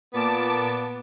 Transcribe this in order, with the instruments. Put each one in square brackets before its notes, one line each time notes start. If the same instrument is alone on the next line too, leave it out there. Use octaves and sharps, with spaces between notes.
[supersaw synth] A#2 A5 D6 [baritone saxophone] B3